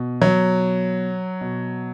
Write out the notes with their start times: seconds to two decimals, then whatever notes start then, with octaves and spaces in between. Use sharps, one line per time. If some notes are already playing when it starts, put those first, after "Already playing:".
Already playing: B2
0.22 F#3
1.41 B2